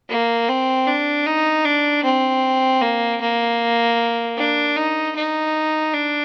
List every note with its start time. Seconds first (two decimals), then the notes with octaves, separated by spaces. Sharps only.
0.10 A#3
0.49 C4
0.87 D4
1.26 D#4
1.65 D4
2.04 C4
2.82 A#3
3.21 A#3
4.37 D4
4.77 D#4
5.16 D#4
5.94 D4